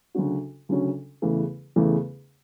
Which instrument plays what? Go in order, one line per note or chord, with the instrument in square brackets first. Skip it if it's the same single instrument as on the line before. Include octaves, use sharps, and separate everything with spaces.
[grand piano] D2 C#3 F#3 C#4 F#4
D2 C#3 F#3 C#4 F#4
E2 C#3 E3 A3
E2 C#3 E3 A3